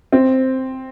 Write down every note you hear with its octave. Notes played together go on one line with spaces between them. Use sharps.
C4